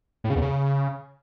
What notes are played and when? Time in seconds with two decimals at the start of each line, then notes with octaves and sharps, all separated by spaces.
0.24 A2
0.30 C#3
0.36 E2
0.42 C#3